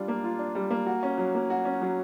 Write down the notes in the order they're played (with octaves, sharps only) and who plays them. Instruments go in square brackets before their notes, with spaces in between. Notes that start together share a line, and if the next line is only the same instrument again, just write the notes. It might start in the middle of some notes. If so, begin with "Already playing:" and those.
Already playing: [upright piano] G3 D4 F4
A#3
F4
D4
G3
A#3
F#4
C#4
F#3
A#3
F#4
C#4
F#3